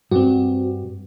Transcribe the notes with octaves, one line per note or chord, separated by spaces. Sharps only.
G2 C4 F#4